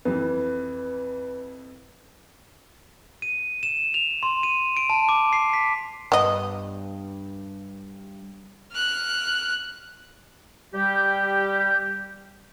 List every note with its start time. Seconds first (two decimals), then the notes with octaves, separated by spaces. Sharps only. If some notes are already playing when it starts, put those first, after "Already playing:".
0.05 F2 E3 B4
3.22 D#7
3.63 E7
3.94 F7
4.23 C6
4.43 D#7
4.77 D7
4.90 A5
5.09 D6
5.33 C7
5.53 B6
6.12 G2 B3 D#5
8.72 F6 F#6
10.74 G3 G4